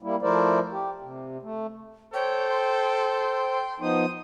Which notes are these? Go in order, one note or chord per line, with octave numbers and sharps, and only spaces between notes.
G3 A#3 E4
F3 A3 E4 A#4 C5 D5
G4
C3
A3
A4 C5 C#5 G5
C6
F3 B3 D#4 C5 D#6